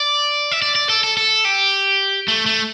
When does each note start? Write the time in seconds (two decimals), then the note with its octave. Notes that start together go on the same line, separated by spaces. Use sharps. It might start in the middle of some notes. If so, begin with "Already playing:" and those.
Already playing: D5
0.51 E5
0.62 D5
0.76 D5
0.90 A4
1.04 A4
1.17 A4
1.45 G4
2.28 A3
2.46 A3